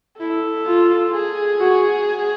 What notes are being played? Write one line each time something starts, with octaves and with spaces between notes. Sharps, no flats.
E4 A4
F4
G#4
F#4